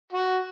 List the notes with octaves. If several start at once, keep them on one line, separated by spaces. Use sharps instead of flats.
F#4